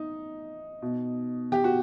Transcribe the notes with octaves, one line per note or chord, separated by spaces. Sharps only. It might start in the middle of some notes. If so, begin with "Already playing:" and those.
Already playing: D#4
B2
G4
F#4